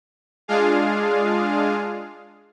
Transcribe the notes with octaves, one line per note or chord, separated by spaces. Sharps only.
G#3 D4 F4 G#4 F5